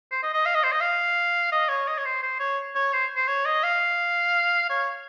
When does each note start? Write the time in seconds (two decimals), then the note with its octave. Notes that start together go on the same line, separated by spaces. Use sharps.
0.11 C5
0.23 D#5
0.34 D#5
0.46 F5
0.55 D#5
0.64 C5
0.72 D#5
0.81 F5
1.52 D#5
1.69 C#5
1.88 D#5
1.98 C#5
2.05 C5
2.23 C5
2.40 C#5
2.75 C#5
2.93 C5
3.16 C5
3.28 C#5
3.46 D#5
3.64 F5
4.70 C#5